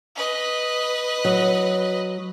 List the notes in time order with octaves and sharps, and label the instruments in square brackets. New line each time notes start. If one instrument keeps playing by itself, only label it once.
[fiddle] B4 D#5
[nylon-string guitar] F#3